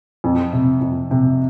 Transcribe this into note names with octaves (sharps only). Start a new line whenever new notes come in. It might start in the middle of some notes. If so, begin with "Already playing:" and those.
F2
C3
F2
C3